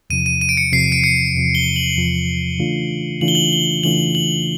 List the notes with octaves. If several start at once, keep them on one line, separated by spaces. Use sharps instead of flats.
E2 C3 F3 D#7
D#7
D#7
D7
C#7
E2 C3 F3 C7
D7
C#7
E2 C3 F3
G7
F#7
E2 C3 F3
C#3 E3 A3 D4 F4
C#3 E3 A3 D4 F4 F#7
G7
F#7
G7
C#3 E3 A3 D4 F4 F#7
F#7